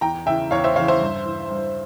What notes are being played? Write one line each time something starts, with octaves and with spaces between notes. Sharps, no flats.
E2 G5 A#5
C#3 E3 E5 G5
E2 C#5 F5
C5 E5
C#3 E3 C#5 F5
C5 E5
G2
E3
G2